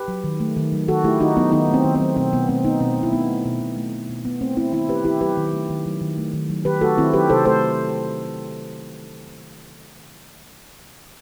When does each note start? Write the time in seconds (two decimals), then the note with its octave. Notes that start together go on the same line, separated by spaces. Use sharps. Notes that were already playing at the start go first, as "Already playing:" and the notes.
Already playing: G4 B4
0.08 F#3
0.24 D#3
0.40 A3
0.57 D#3
0.72 F#3
0.88 D#3 F#4 A4
1.04 A3 E4 G4
1.20 D#3 D#4 F#4
1.36 F#3 B3 D#4
1.52 D#3 B3 D#4
1.69 A3
1.74 C4
1.84 D#3
1.95 C4
2.01 F#3
2.17 B2 C4
2.33 B2 B3
2.49 A3 C4
2.65 A3 B3 D#4
2.81 B2 C4
2.97 B2
3.03 E4
3.13 A3 B3 D#4
3.29 A3
3.45 B2
3.61 B2
3.77 A3
3.93 A3
4.10 B2
4.25 B2 B3
4.41 A3 C4
4.57 A3 C4 E4
4.73 D#3 C4 E4
4.89 A3 G4 B4
5.05 D#3 E4 G4
5.21 F#3 G4 B4
5.37 D#3
5.53 A3
5.70 D#3
5.86 F#3
6.02 D#3
6.18 A3
6.33 D#3
6.50 F#3
6.65 D#3 G4 B4
6.81 A3 F#4 A4
6.98 D#3 C4 E4
7.13 F#3 G4 B4
7.30 C3 A4 C5
7.45 A3 A4 C5